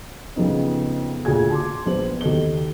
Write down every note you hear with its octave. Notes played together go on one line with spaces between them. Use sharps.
F2 C#3 B3 D#4
D2 A#2 G4 G#4 G#6
A5 C6 D6
A#1 B3 C5 F#7
D#2 A4 D#5 G7